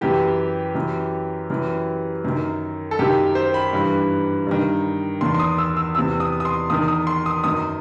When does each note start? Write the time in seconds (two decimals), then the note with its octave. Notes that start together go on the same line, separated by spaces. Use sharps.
0.01 F#2 E3 G4
0.75 F#2 E3
1.50 F#2 E3
2.25 F#2 D#3
2.91 A4
2.99 F#2 D#3 G4
3.35 C5
3.54 B5
3.73 G2 E3
4.47 G2 D#3
5.21 E2 D#3 C6
5.34 C6
5.40 D#6
5.58 E6
5.77 E6
5.95 E2 C3 E3 E6
6.20 D#6
6.40 D#6
6.45 C6
6.70 E2 D#3 D#6
6.88 D#6
7.07 C6
7.26 D#6
7.44 F#2 D#3 D#6